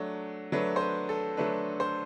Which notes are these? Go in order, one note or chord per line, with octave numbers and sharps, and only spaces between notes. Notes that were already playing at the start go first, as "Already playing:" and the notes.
Already playing: F#3 A3 D4
F#3 A3 D4 B4
C5
B4
A4
F#3 A3 D4 B4
C5